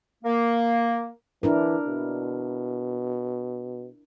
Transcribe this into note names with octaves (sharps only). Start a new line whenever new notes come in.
A#3
E3 D4 E4 A#4
B2